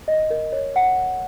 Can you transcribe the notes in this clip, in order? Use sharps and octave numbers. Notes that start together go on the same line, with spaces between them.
D#5
A#4
C#5
F#5